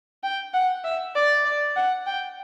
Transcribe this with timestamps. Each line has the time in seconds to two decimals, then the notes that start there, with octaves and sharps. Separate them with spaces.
0.23 G5
0.54 F#5
0.84 E5
1.15 D5
1.45 D5
1.76 F#5
2.06 G5